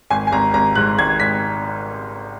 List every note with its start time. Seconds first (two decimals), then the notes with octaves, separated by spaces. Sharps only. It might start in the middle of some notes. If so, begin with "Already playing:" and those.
0.10 G#1 G#5
0.27 G#5
0.32 G#1 A#5
0.54 G#1 A#5
0.75 G#2 F#6
0.98 G#1 G#6
1.20 G#1 B6